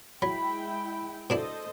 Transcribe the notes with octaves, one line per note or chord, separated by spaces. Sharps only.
F#3 G#3 E4 G5 B5
B2 D4 E4 A4 C5 D#5